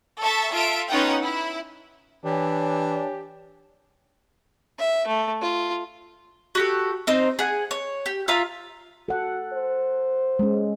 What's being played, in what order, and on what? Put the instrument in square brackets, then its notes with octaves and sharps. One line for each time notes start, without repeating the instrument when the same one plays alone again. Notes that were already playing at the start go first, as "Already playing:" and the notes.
[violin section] A4 E5 A5 C#6
F4 A4 E5 D7
B3 C#4 D#4 F4 F#5 G5
E4
[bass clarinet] E3 [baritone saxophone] D4 [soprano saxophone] G4 [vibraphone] C#5 G#5
[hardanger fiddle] E5
A3
F4
[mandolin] F#4 G4 A4
C4 D#4 C5
G#4 F#5
C#5
G4
F4 E5 F5 A#5
[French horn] F#4 [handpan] A4 F#5
[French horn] C5
[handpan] G#3 C#4